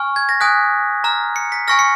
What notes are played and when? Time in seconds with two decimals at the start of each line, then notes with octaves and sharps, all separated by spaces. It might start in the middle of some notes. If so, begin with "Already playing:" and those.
Already playing: G#5 C#6 F6
0.16 G#6
0.29 A#6
0.40 G#5 D#6 F#6 B6
1.04 A#5 F6
1.36 C#7
1.52 B6
1.68 G#5 C#6 F6 A#6
1.79 C#7